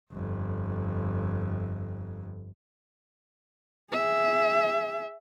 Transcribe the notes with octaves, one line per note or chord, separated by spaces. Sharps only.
G1 F2
G#4 E5